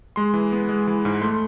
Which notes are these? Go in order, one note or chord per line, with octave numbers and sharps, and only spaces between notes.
G#3 C6
E3
B3
G#3
E3
G#2
A3 C6